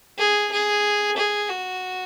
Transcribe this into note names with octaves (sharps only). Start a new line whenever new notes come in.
G#4
G#4
G#4
F#4